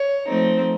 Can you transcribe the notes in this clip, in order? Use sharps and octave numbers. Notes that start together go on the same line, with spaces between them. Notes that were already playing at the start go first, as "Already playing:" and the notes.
Already playing: C#5
F3 A3 C4 D#4